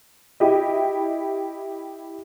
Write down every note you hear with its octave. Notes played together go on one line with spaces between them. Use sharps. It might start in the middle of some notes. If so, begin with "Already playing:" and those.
E4 G4 D#5